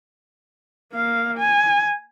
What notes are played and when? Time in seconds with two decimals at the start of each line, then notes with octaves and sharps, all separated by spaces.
0.94 A#3 F5
1.38 G#5